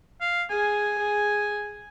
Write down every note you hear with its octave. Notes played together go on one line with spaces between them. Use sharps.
F5
G#4 G#5
G#4